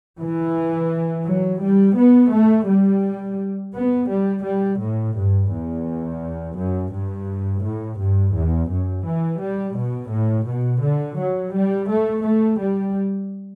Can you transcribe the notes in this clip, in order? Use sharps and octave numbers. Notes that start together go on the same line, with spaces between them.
E3
F#3
G3
B3
A3
G3
B3
G3
G3
A2
G2
E2
F#2
G2
A2
G2
E2
F#2
E3
G3
B2
A2
B2
D3
F#3
G3
A3
A3
G3